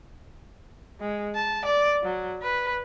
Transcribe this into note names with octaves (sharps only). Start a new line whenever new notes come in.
G#3
A5
D5
F#3
B4